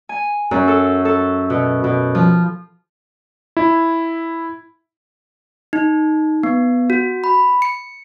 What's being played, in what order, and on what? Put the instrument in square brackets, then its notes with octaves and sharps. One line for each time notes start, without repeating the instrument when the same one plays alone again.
[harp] G#5
F#2
A4
A4
B2
B2
F3
[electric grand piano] E4
[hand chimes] D#4
B3
F#4
B5
C#7